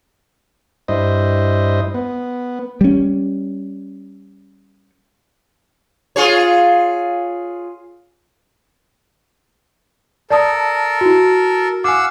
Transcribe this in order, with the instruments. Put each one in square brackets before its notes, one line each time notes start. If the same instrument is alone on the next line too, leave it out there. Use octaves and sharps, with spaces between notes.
[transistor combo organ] G2 E4 C5 D#5
B3
[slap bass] G3 C#4
[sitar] F4 G#4 C#5
[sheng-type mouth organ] A4 A#4 [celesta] D5 A5 D#6
[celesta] E4 F#4
[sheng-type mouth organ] F5 F#5 E6 [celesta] G#5 D6